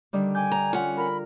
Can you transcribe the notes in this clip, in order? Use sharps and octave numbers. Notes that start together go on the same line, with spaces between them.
D3 D#3 G3
G5 G#5 D6 G6
A#5
C#4 F4 F#5
A#4 B5